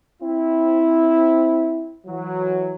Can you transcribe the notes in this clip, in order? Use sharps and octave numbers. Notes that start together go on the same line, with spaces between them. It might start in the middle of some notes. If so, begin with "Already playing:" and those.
C4 E4
E3 F#3